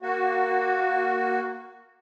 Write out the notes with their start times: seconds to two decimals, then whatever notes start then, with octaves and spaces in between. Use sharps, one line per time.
0.02 A#3 F#4